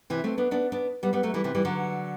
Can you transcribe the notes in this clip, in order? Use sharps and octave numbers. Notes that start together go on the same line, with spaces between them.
C3 E3
A3 C4
B3 D4
B3 D4
B3 D4
G3 B3
G3 B3
F#3 A3
E3 G3
C3 E3
E3 G3
D3 F#3